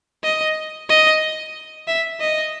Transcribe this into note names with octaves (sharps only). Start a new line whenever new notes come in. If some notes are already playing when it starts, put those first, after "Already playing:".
D#5
D#5
E5
D#5